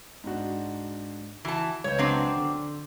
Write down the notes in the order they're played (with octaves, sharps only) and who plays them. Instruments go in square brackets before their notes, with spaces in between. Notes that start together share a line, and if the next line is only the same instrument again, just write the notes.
[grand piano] G#2 D4 F#4
[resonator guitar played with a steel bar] E3 A5 [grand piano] E4 F#4
[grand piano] C#2 B4 G6 [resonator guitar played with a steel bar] C#5
[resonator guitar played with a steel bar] F#3 C4 D4
[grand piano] D3